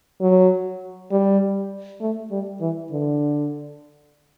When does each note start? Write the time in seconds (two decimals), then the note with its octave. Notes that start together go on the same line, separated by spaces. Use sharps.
0.21 F#3
1.11 G3
2.00 A3
2.31 G3
2.60 E3
2.91 D3